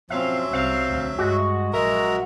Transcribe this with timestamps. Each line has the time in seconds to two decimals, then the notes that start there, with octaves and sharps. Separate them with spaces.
0.10 F3 F#3 C4 C#4 E5 F5
0.53 C2 C4 F5
0.89 D2
1.18 G2 G#3 F#4
1.73 A#1 F#3 G#3 A#4 E5 A#5